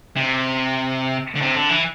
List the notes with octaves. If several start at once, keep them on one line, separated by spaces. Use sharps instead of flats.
C3
D3
C3
D3
E3